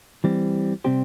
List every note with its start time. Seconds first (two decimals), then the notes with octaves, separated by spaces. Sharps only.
0.24 E3 G3 C4
0.84 C3 G3 C4 G4 C5